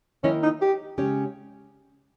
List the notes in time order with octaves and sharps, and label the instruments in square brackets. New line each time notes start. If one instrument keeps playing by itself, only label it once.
[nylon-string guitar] D#3 A#3 E4 A#4 D#5 [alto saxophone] C#4
[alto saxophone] D#4
G4
[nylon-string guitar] C#3 G#3 C#4 G4 C#5